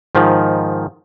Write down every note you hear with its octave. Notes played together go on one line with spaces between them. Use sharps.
G#2 D#3 F3